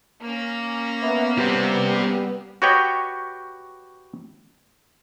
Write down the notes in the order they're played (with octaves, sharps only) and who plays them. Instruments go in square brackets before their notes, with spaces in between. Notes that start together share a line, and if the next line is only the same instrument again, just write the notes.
[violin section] A#3 C#4
[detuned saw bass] B3 [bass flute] E5
[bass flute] G3 [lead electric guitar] G4 C5
[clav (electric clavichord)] F#4 G4 B4 C#5 D#5 G5